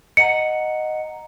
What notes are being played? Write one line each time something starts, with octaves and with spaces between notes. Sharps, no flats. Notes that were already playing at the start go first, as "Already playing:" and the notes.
D#5 F#5 A#5 C#7